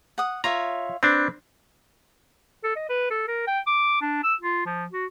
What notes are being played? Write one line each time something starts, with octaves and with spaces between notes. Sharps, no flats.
F#5 D#6
F4 C#5 E5 A#5
C4 D4 B4
A4
D#5
B4
A4
A#4
G5
D6
D4
E6
F4
F3
F#4